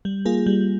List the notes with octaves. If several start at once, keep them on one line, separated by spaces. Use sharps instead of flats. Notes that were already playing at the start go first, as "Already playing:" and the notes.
G3
A#3 F4 G#4
G3